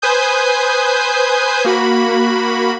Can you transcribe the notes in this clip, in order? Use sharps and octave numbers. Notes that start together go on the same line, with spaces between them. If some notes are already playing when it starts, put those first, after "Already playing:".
B4 C5 G#5 D#6 G6
A#3 F#4 B5